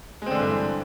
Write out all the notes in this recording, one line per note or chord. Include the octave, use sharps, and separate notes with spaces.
G2 D3 E3 G#3 C4